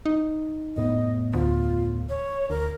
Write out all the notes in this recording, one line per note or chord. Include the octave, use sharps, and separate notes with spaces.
D#4
F1 A2 B3 D#5
D2 F4
C#5
D2 A#4